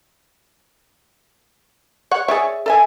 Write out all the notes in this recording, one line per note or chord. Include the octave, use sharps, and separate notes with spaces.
C#5 F#5
G#4 C#5 D5 E5
A4 E5 G#5